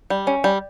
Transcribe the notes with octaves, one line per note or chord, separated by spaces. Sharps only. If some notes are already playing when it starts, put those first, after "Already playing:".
G3
C#4
G3